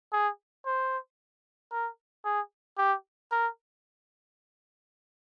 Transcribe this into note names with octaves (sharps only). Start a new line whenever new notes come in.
G#4
C5
A#4
G#4
G4
A#4